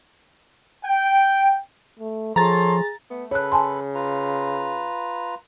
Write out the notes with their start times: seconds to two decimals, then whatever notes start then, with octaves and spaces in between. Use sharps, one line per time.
0.85 G5
1.99 A3
2.36 F3 G#4 A4 C#5 A#5 C6 A6
3.10 A3 B3
3.31 C#3 A4 B4 C#5 B5 F#6
3.52 G#5 A5 C6
3.95 F4 B4 A#5